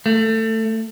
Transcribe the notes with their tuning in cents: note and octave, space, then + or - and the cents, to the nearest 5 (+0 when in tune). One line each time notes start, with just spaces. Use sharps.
A3 +20